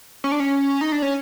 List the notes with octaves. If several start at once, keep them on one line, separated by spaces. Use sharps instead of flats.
C#4
D4
C#4
D#4
D4
C#4